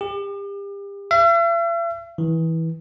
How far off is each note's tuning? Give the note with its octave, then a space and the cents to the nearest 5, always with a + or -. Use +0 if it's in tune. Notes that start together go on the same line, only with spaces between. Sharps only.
G4 +35
E5 +45
E3 -20